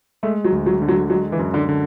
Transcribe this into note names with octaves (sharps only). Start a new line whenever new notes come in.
G#3 A3
F#3
D2
F#3
D3
F#3
F#3 G#3
E3
F#2
D3
D3